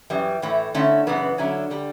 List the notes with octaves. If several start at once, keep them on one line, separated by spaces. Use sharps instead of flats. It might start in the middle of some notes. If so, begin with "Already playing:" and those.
F#2 E3 G3
A2 E3 A3
D3 A3 C#4 E4
F#2 C#3 E3 B3
D3 F#3 C#4 E4
D3 G3